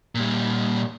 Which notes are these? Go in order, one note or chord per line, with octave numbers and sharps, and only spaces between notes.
A#2 G3